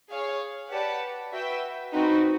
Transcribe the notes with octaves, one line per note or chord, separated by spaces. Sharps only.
G#4 C#5 F5
G4 B4 D5 F#5 A5
F#4 B4 E5 G5
C4 D#4 F#4 B4